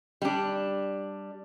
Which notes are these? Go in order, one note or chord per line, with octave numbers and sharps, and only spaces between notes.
G3 D4